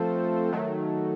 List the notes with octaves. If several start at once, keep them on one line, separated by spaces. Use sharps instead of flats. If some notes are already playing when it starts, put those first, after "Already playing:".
Already playing: F3 A3 C4
D#3 F#3 A3